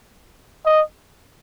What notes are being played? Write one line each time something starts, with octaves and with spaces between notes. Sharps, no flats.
D#5